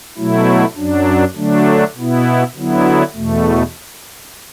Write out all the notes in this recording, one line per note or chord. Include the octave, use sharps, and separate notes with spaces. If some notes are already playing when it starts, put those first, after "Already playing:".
B2 F#3 A3 E4
F#2 F#3 D4
D3 F#3 A3 D4
B2 B3 E4
D3 F#3 B3 E4
E2 B2 A3